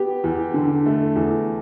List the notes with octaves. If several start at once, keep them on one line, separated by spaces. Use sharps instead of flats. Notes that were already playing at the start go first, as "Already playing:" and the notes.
Already playing: B3 G4
E2
D3
A3
E2